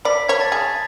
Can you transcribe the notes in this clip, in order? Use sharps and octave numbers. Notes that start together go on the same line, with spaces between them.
D5 B5 B6
C#5 G#6
A5 A6
G#4